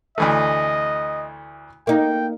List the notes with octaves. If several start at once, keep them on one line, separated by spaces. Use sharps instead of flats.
D2 E3 A3 D#5
A#3 D#4 G5